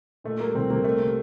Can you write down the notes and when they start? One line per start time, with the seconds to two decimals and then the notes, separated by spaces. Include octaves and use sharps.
0.24 A#2 A3
0.39 G3 A#3
0.51 A#3
0.54 C2 C4
0.70 C2 A#3
0.84 A3 A#3
1.00 C3